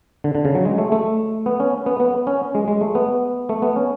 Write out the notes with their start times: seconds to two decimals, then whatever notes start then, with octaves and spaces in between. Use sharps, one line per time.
0.24 D3
0.35 D3
0.45 C#3
0.55 F#3
0.65 G#3
0.78 A3
0.92 A3
1.46 B3
1.60 C#4
1.86 B3
2.00 B3
2.27 C#4
2.55 G#3
2.68 G#3
2.81 A3
2.95 B3
3.49 A3
3.62 B3
3.76 C#4